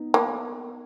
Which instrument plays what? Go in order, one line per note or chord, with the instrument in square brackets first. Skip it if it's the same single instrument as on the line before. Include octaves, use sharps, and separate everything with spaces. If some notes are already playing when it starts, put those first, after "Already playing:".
Already playing: [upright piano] B3 D#4
[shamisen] A#3